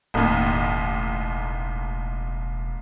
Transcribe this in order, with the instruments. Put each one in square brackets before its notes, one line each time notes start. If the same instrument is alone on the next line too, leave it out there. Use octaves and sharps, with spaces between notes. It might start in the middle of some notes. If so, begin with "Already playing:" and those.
[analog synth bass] E1 [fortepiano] A1 D#2